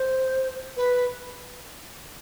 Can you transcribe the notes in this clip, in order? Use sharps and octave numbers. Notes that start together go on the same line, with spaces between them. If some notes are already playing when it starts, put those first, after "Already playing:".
Already playing: C5
B4